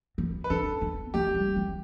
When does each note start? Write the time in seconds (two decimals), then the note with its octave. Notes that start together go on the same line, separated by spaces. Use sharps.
0.18 E3
0.44 B4
0.50 D4 A4
0.81 B3
1.14 A3 G4
1.35 G3
1.56 E3